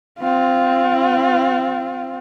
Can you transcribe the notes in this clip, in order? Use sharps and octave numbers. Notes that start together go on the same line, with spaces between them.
C4 F4